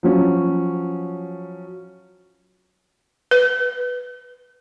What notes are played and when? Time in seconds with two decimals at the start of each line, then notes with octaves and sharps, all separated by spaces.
0.03 F3 F#3 C#4
3.31 B4